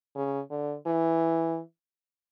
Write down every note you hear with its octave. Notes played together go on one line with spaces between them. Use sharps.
C#3
D3
E3